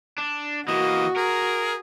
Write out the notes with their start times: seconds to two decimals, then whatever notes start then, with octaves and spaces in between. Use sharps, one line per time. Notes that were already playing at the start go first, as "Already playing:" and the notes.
0.18 D4
0.68 E3 A#3 F#4 D#5
1.17 G#4 A#4